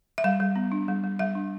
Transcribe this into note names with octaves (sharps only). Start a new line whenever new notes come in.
E5
G3 F5
G3
B3
D4
G3
G3
G3 E5
D4